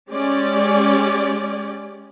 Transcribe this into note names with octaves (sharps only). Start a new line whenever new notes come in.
G#3 C#4 G4 D5